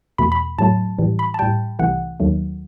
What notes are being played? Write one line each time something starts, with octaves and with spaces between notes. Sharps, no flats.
E2 B2 A3 B5
B5
A2 F#3 A3 A5
A2 E3 G3
B5
A5
A2 G3 G5
C2 C3 E3 A3 F#5
D#2 D#3 F#3 A3